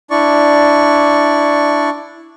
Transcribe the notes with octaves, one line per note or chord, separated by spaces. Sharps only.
D4 E4 D5 C#6